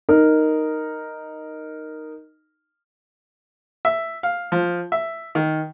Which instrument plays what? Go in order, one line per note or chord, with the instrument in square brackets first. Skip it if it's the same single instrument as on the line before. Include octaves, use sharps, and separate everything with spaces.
[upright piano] D#4 A#4
[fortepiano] E5
F5
F3
E5
D#3